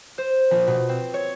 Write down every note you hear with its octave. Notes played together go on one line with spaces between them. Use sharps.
C5
A#1
B2
C4
C#5